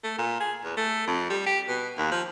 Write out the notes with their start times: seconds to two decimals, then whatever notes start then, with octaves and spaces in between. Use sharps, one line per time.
0.04 A3
0.18 A#2
0.40 G#4
0.64 E2
0.77 A3
1.07 F2
1.30 G3
1.47 G4
1.68 B2
1.97 D#2
2.11 F3